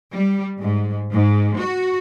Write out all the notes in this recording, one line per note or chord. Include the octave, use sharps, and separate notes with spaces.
G3
G#2
G#2
F#4